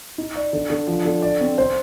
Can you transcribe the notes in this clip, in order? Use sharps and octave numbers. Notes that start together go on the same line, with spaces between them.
D#4
D5
D3
D3
F3
D3
D5
C4
C5